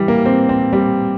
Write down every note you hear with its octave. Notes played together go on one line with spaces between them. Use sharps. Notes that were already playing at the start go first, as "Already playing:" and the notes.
Already playing: E3 G3
A#3
C4
C4
G3